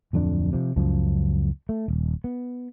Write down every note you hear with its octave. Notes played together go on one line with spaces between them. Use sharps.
D1 F2 D3 D4
C3 F3
C#2 F#2 F3
A3
D#1
B3